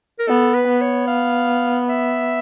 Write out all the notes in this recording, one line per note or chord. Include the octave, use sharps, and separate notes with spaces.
A#4
B3 A4
B4
B3
C#5
F5
E5